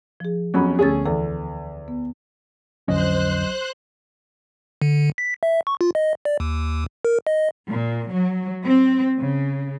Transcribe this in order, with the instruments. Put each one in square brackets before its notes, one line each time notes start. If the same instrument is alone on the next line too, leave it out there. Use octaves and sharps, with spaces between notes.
[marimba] F3 G#4
[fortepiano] F2 F#3 C#4 [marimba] B3 B5
[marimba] D2 D3 A6 [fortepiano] A3 C#4 G#4
[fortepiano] E2 [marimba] A4
[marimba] B3
[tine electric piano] B1 F#3 D#5 [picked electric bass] F2 D3 C#4 [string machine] C5 F#6
[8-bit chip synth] D3
B6
E5
C#6
F4
D#5
D5
D#2
A#4
D#5
[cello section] A#2
F#3
C4
C#3